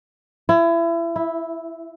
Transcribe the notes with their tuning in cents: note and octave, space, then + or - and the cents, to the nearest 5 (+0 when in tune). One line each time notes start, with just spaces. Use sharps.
E4 +30
E4 -5